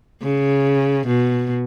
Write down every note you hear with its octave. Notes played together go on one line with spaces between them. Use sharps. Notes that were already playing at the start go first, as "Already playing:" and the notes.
C#3
B2